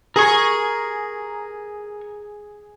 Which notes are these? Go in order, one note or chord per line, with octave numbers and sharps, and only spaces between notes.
G#4 A#4 C#6